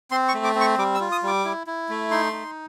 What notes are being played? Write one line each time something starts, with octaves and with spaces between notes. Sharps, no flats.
C4 C6
C#6
A3
D6
C4
C#6
G3 D6
E6
F4
D#6
G3 D6
E4
E4
A3
D#4 C6
D#4